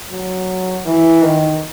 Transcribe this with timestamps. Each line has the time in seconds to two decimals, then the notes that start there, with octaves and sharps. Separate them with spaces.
0.12 F#3
0.86 E3
1.23 D#3